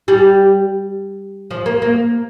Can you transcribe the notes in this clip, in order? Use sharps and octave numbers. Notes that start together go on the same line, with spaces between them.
G3
F3
A#3
A#3